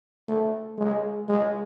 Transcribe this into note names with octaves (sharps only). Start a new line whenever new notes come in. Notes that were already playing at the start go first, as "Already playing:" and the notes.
A3
G#3
G#3